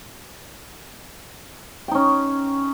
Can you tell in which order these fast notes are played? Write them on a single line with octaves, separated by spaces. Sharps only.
G5 D#4 C#4